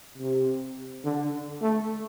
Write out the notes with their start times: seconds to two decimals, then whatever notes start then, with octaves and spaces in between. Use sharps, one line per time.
0.18 C3
1.05 D3
1.61 A3